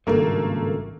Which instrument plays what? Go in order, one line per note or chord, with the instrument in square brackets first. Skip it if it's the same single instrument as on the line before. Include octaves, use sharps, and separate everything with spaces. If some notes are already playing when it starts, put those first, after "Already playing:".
[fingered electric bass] G#1 C#2 G2 [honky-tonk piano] A3 A#3